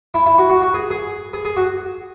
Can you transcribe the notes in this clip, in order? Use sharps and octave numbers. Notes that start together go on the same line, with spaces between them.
E4
E4
F#4
F#4
F#4
G#4
G#4
G#4
G#4
F#4